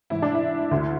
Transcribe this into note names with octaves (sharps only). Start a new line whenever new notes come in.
G#2 E3 E4
D4
E4
D2 D3